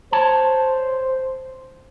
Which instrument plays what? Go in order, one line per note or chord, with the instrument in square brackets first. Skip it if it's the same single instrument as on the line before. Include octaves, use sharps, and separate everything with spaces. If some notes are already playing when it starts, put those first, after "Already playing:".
[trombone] C5 [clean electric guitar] C#5 A5